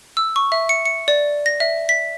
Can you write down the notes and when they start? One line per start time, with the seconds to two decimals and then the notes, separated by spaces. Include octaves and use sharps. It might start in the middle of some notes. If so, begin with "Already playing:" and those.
0.17 E6
0.36 C#6
0.52 E5
0.69 C#7
0.86 C#7
1.08 D5
1.46 A#6
1.60 E5
1.89 B6